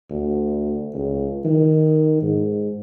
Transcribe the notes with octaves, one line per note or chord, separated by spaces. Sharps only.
D2
C#2
D#3
G#2